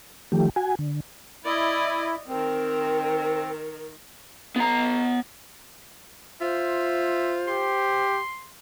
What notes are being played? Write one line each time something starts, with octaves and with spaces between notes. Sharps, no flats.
D#3 F3 A3 G4
F#4 G#5
D3
E4 D5 D#5
D#3 C4 A#4
B3 A#5
F4 C5 E5
G4 C6